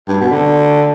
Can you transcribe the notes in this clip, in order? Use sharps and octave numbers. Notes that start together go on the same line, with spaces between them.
G2
B2
D3